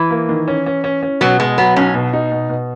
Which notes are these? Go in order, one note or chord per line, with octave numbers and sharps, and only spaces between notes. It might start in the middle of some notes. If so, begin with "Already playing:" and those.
Already playing: E3
A#3
D#3
C#4
C#4
C#4
C#4
B2 F#3
B2 G#3
F#3 B3
B1 C#4
B2
D#4
B2
B2